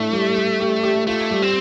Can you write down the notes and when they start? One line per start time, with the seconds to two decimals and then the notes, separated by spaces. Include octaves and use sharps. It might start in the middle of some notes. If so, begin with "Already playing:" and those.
Already playing: A2 A3 D4
0.13 G3
0.36 G3
0.60 G4
0.83 G4
1.07 A3 F4
1.31 G3
1.42 C4